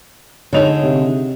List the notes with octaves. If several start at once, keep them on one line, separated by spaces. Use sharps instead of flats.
D3 D#4 G#4 C#5 F7
C3